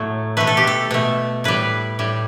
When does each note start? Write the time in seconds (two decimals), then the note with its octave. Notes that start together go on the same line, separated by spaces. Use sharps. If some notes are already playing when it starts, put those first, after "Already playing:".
Already playing: A2 F#3 A3
0.37 B2 A3 B4
0.47 A4
0.57 G4
0.67 A4
0.91 B2 A3
1.44 A2 G3 B4
1.99 A2 G3